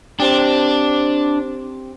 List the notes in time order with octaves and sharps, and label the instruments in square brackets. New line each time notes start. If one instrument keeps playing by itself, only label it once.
[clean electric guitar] C4 G4 [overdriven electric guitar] D4